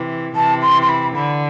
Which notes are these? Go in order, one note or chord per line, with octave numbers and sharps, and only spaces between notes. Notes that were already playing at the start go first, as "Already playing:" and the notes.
Already playing: C3 E3
C3 E3 A5
C6
C6
B5
D3 B5